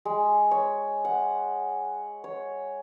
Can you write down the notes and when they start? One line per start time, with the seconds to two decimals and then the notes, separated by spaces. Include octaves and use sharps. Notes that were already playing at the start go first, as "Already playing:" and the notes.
0.05 G#3
0.51 C#5
1.05 F#5
2.24 C#5